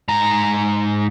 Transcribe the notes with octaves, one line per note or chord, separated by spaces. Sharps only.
G#2 A#5